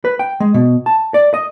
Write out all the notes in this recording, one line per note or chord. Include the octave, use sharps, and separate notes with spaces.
B4
G5
G#3
B2
A5
D5
D#5